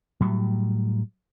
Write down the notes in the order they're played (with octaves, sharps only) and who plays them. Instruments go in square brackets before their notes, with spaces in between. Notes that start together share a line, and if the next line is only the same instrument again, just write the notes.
[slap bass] A2 F#3 G3